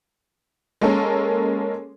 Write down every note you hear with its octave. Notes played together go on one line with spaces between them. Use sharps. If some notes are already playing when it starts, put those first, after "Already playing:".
G#3 A#3 C#4 A4 A#4